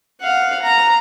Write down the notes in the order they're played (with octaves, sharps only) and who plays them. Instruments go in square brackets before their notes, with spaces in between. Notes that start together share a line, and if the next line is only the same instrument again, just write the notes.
[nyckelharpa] F5 F#5
A#5